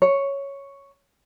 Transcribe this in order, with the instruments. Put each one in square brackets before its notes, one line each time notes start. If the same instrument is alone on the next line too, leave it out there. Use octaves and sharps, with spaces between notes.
[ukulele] C#5